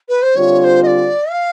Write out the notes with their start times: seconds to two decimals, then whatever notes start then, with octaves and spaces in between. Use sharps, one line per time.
0.08 B4
0.22 C5
0.36 D3 G3 C4 F4 C#5
0.59 C#5
0.63 C5
0.82 D#5
0.86 D5
1.30 F5